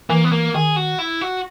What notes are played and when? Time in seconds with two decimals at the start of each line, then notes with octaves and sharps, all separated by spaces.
0.10 E3 A#3
0.24 B3
0.32 A#3
0.54 D#3 G#4
0.76 F#4
0.99 E4
1.21 F#4